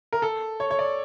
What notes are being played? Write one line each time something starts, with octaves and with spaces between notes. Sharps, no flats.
A#4
A4
C#5
C#5
D5